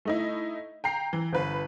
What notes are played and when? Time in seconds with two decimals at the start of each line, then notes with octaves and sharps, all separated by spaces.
0.05 A3 D#4 E4
0.84 G5 A#5 C7
1.13 E3
1.33 G1 B4